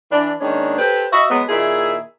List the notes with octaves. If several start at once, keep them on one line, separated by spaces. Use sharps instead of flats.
E3 D4
D#3 G#3 A#3 C#4 D4
G4 A4 B4 C5
F#4 D#5 E5
F#3 G#3 B3
A#2 D#3 E4 G#4 E5